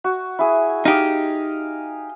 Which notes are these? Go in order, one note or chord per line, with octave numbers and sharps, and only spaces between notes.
F#4
E4 G#4
D#4 G4 D#5 F5